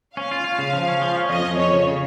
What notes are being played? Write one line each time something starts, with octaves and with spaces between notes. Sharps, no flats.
C#4 F5
F4
F4
C#3
F3
C#4
F3
C#4
F2 D#5
F2
F2 C#5
C#3
C#3